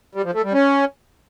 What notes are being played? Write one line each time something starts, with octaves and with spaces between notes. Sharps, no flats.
G3
F3
A3
G3
C#4